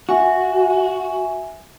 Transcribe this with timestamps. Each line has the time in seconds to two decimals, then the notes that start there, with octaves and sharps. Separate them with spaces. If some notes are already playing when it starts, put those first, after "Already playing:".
0.09 F#4 E5 G#5